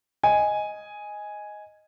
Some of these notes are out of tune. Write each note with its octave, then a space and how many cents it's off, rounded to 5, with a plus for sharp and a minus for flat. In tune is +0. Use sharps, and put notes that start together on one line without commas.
D#5 +5 G#5 +0